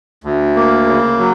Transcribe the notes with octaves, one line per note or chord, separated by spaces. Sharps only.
D2
A#3
C#3
F#3